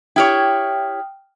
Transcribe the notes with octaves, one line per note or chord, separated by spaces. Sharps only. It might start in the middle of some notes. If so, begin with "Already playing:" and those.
E4 G4 C#5 G5 D#6 F6